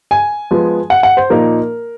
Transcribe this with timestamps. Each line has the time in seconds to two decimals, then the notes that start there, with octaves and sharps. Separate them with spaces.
0.11 G#5
0.51 F3 G#3 B3
0.90 F#5
1.03 F#5
1.17 C5
1.30 A#2 F3 A#3 D#4 A#4